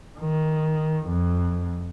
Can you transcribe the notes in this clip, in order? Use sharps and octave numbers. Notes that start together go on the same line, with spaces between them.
D#3
F2